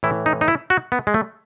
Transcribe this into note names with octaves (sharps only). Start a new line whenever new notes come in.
A2 E3 E4
D#4
D#4
E4
F#4
B3
G#3
A3